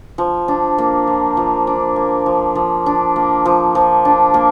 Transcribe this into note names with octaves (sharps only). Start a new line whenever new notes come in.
F3
D4
A#3
F3
F3
D4
A#3
F3
F3
D4
A#3
F3
F3
D4
A#3